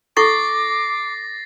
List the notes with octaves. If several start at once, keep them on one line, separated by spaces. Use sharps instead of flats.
E4 A4 C#6 D6 A6 A#6 C7